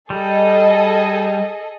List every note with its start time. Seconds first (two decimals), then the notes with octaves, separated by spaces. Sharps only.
0.10 G3 G#4 A4 D#5